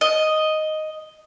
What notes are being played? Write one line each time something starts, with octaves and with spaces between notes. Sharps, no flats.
D#5